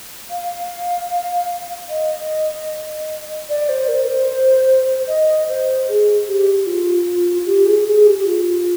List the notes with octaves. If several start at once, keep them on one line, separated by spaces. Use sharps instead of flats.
F5
D#5
D5
C5
A#4
C5
D#5
C5
G#4
G4
F4
G4
G#4
G#4
G4
G4
F4